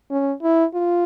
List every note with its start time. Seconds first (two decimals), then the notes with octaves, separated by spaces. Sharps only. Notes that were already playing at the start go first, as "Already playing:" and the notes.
0.11 C#4
0.43 E4
0.74 F4